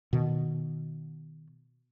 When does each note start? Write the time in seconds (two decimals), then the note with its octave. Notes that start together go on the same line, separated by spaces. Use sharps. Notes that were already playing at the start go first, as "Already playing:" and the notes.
0.13 B2 D#3